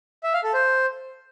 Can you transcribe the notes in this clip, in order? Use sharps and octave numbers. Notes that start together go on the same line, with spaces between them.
E5
F5
A4
C5